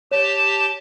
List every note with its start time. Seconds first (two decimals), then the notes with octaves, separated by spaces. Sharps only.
0.11 G4 C#5 A5